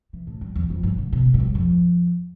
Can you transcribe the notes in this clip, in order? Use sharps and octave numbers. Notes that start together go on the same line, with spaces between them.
E3
A2
G2
E2
F2
G2
D3
B2
B2
A2
G2
F2